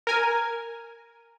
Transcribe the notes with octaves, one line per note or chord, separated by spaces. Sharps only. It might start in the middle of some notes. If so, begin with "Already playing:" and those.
A#4 G#5